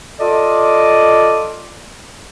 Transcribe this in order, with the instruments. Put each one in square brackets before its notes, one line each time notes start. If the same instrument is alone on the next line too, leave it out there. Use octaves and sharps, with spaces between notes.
[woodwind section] F4 A4 D5 D#5